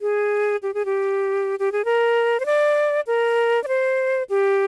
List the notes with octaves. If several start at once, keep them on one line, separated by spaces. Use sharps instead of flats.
G#4
G4
G#4
G4
G4
G#4
A#4
C5
D5
A#4
D5
C5
G4